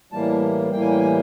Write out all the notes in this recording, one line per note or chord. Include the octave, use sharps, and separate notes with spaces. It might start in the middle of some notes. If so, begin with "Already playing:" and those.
A2 E3 G3 A#3 A5
A2 E3 G3 A#3 G5
G#5
G5
G#5